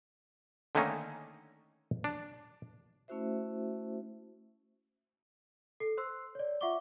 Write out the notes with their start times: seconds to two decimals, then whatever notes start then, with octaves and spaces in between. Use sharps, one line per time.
0.75 D3 D#3 A3 A#3 C#4 D#4
2.04 D4
3.08 A3 C#4 E4 F#4 C5 E5
5.80 A4 C7
5.98 C5 C6 E6
6.35 C#5 D5
6.61 F4 E5 F#5 C#6 D6 G7